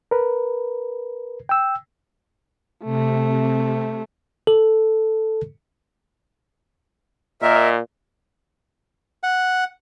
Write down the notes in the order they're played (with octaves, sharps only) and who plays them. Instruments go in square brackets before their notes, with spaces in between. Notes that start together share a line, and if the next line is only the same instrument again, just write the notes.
[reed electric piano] A#4 B4
G5 E6
[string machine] C3 [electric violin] A3
[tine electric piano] A4
[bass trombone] A#2 [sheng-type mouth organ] A#4 E5 [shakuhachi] D#5
[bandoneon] F#5